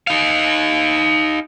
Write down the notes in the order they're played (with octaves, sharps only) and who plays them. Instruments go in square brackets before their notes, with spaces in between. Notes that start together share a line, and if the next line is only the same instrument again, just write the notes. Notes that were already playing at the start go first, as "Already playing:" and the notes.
[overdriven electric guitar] D#4 F5